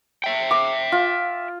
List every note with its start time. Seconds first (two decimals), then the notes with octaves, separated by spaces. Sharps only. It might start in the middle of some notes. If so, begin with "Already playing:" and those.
0.24 E5 G5
0.51 D6
0.92 F4